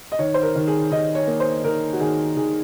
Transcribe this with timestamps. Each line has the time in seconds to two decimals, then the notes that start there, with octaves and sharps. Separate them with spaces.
0.12 D#5
0.19 D#3 C#5
0.34 C5
0.43 A#4
0.55 D#3
0.67 G#4
0.92 D#3 D#5
1.15 C#5
1.27 A#3
1.40 C5
1.64 D#3 A#4
1.93 F#4
2.00 D#3 G#4
2.36 D#3 G#4